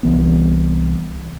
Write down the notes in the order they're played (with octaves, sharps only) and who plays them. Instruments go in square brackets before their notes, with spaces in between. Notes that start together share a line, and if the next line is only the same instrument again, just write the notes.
[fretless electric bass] C2 E3 B3